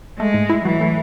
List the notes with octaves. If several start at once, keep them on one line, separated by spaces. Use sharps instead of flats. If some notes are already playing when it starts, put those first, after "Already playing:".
G#3 A3
G#2
E4
E3 F#3
A3